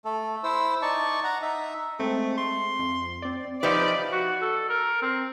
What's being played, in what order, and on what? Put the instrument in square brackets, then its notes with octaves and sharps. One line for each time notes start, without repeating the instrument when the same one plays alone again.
[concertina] A3 A4
E4 C5 E6
D#4 D5 A5 C#6
F#5 A#5
D#4 E5
[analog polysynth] G#3 C4 [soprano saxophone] A3
[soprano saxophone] C6
[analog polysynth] F2
C4 D5
[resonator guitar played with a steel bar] F3 D#4 B4 [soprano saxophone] G4 [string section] D5 [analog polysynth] E5 F6
[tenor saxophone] F#4
A4
A#4
C4